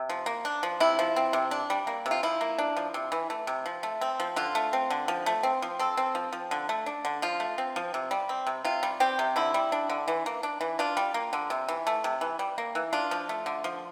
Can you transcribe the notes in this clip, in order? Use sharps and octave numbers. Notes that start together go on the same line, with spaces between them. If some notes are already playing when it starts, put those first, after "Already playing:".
Already playing: C3
F3
A#3
D4
F3
C3 E4
F3
C4
C3
D4
G3
A#3
C3
F4
F3 E4
A#3
D4
F3
C3
E3
A3
C3
F3
A3
C4
F3
D3 F4
A3
C4
D3
F3
A3
C4
F3
C4 A4
C4
F3
F3
D3
A3
D4
D3
F3 F4
A3
C4
F3
C3
G3
C4
C3
C3 F4
G3
C4 G4
C3
D3 E4
G3
D4
D3
E3
A#3
D4
E3
D4 F4
G3
A#3
D3
C3
E3
A3
C3
E3
G3
A#3
E3
D4 F4
F3
A3
D3
F3